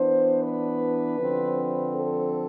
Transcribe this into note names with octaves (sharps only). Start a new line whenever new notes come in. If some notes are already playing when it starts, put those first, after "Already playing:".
Already playing: E3 B3 D4 C5
B4
D3 F3 C4
A4